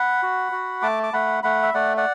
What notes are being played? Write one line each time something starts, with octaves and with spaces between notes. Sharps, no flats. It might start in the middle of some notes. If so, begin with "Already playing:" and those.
Already playing: F#5 B5
F#4
F#4
A3 A5 D6
D6
A3 F#5 B5
A3 F#5 B5
E5
A3 D5 F#5
D5 F#5